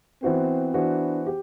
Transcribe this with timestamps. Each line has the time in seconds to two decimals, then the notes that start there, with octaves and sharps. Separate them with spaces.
0.22 E3 B3 C4 F#4 C5
0.74 E3 B3 D4 F#4 C5
1.27 G4